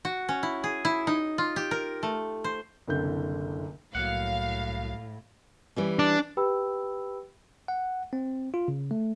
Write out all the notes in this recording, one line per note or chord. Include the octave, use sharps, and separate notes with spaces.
F#4
C#4
E4
G#4
E4
D#4
F4
G4
A#4
A3
C5
F#1 C2 D3 G6
C2 A2 F#3 A#3 F5 F#5
E3 G3 C#4
D4
G4 B4 G5 B5 E6
F#5
C4
F4
C#3
A3